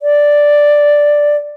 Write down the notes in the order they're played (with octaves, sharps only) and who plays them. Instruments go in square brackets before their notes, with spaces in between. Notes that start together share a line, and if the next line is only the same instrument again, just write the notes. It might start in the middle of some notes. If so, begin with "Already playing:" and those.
[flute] D5